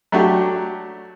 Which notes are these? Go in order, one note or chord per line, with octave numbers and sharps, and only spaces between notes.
F#3 A3 D4 F#4 G4